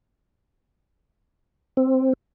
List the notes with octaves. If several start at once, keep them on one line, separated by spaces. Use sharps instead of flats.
C4